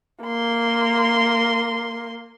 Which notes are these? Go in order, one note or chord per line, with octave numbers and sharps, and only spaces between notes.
A#3 C6